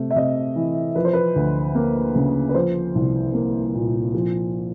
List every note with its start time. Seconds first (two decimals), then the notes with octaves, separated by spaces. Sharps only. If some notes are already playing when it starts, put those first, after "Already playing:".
Already playing: C3 A3
0.11 E5
0.16 C3 D#5
0.56 E3
0.95 F3 B4
1.05 C5
1.13 B4
1.36 D2
1.75 A#3
2.15 C#3
2.49 B4
2.54 F3 C5
2.95 C2
3.34 A#3
3.75 A#2
4.14 F3